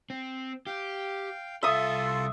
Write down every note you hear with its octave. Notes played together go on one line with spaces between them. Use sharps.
C4
G4 F5 G5
C2 F4 A4 E5 C6 D#6